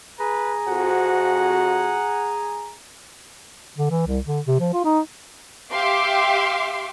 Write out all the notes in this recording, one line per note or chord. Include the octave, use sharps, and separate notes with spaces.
G#4 B4 G#5 A#5
F2 F#4 F#5
D3
E3
C2
D3
C3
F3
F4
D#4
G4 E5 F5 C6 D6